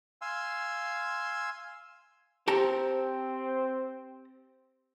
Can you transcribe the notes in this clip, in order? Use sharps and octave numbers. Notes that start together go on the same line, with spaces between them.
F5 G#5 C6 E6
C4 G4 A5 A#5